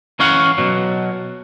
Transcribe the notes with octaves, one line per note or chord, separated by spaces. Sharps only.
E3 C#4 C#5 F5 F#5
B2 F#3